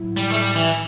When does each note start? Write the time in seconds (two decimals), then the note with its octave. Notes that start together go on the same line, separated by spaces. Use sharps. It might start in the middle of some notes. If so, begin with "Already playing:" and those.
Already playing: A2 F#3 E4
0.17 G3
0.31 A3
0.36 G3
0.56 E3